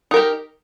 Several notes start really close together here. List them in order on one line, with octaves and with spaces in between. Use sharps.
D#4 A#4 G4